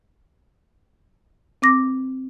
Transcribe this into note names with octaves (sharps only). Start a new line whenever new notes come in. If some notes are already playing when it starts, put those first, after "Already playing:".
C4 D6 A#6